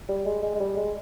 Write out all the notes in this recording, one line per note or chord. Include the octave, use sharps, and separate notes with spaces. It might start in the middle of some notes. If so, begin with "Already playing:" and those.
G3
G#3
G#3
G#3
G3
G#3